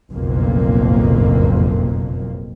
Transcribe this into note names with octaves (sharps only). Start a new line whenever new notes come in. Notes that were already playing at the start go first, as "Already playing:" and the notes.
F#1 B1 F2 A2 A#3